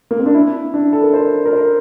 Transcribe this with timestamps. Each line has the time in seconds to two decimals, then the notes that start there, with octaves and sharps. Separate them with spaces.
0.11 A#3
0.19 C4
0.26 D4
0.34 E4
0.74 D4
0.93 A4
1.03 A#4
1.13 C5
1.46 A#4
1.53 C5